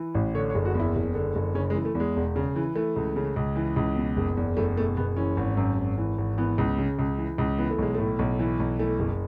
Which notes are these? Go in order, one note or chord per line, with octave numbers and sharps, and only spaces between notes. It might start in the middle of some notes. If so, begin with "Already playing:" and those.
Already playing: E3
A1
D3 C#5
C#5
F#1
F#4
E2 E4
F#1
D3
F#1
C#3 C#4
G#3
E3
A3
E2
G#3
E1
C#3
E3
E3 A3
C#2
C#3
C#2
E3
C#2
B2
F#1
E2
F#1 A3
B2 A3
F#1 B3
E3 C#4
G#1
F#2
G#1
E3
G#1
E3 B3
C#2
C#3
C#2
E3
C#2
E3 B3
A3
B1 G#3
A2 A3
B1
E3
B1
E3 A3
F#1